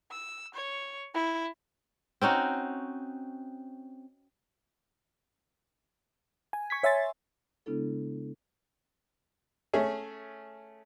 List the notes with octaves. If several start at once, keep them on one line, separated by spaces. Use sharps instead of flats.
E6
C#5
E4
C4 C#4 D#4 F#4
G#5
C#6 G#6 B6
C#5 E5 G#5 C6 A6
C#3 G#3 B3 D4 E4 A4
A3 C#4 G#4